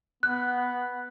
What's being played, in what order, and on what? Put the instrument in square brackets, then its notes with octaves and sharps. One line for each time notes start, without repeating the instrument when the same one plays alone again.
[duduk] B3 [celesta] F#6